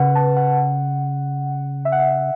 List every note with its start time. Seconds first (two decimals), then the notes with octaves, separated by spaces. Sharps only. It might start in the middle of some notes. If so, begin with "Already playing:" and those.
Already playing: C#3 B4 F#5
0.15 A5
0.37 F#5
1.85 E5
1.92 F#5
1.99 E5